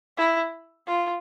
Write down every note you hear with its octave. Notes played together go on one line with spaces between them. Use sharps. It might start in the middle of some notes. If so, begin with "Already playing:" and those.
E4
F4